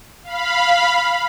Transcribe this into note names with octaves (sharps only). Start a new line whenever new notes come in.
F5 B5